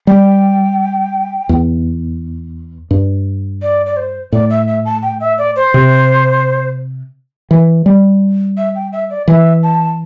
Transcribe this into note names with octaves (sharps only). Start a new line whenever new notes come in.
G3 G5
E2
G2
D5
D5
C5
A2 D5
E5
E5
A5
G5
E5
D5
C5
C3
E3
G3
E5
G5
E5
D5
E3 E5
A5